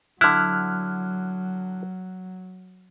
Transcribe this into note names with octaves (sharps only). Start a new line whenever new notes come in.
D3 F#3 E4 F6 F#6